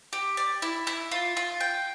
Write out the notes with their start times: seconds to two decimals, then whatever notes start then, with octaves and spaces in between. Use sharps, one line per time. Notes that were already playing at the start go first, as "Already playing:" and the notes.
0.13 G4
0.37 D5
0.62 E4
0.87 E4
1.11 F4
1.37 F4
1.60 G5